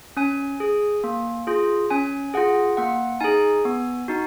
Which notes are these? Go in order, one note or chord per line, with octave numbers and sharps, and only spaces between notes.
C#4 G#5
G#4
A#3
F4 G#4
C#4 G#5
F4 G#4 F#5
A#3 F#5
D#4 G#4 G#5
B3
D#4 F#4